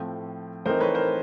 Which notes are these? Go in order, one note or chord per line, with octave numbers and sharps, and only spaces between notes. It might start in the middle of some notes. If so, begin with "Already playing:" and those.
Already playing: A2 F3 A3 C4
E3 A3 C4 D#4 A#4 C5
B4 C#5
A#4 C5